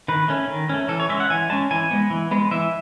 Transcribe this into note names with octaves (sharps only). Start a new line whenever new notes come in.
D#3 B4
A3 C#4
D#3
A3 C#4
E3 A4
C#5
G#3 C#4 E5
F#5
E3 G#5
G#3 C#4 A5
E3 G#5
G#3 B3
E3
G#3 B3
E3 E5